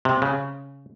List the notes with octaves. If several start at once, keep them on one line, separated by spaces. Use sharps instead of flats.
C3
C#3